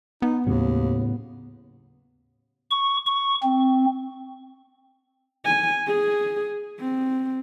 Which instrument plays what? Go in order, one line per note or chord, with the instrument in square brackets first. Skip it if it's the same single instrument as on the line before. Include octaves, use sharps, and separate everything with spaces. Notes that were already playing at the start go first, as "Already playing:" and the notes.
[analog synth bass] B3 [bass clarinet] D#4
[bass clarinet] D#2 [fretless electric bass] A2 C#3 F#3
[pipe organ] C#6
C#6
C4
[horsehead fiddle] G#5
G#4
C4